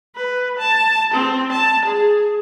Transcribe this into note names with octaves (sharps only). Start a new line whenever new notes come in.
B4
A5
C4
A5
G#4